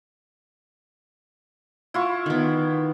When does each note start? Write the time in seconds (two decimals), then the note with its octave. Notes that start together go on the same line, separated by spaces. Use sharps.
1.94 E4 F4 C#6
2.26 D#3 B3